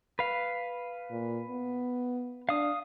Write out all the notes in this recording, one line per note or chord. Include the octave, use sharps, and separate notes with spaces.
B4 F5
A#2
B3
D4 F5 D#6